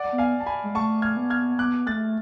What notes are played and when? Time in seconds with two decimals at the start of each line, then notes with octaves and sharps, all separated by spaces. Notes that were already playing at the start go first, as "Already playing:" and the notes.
Already playing: D5 F#5
0.12 B3
0.18 F5 G#5
0.40 A5
0.46 G#5 B5
0.64 G#3
0.75 A3 A5 C#6
1.02 F6 G#6
1.17 B3
1.30 F6 G#6
1.59 B3 D6 F#6
1.87 A3 F#6 A6